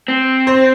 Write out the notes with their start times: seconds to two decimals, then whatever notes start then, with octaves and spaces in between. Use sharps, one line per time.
0.08 C4
0.47 C5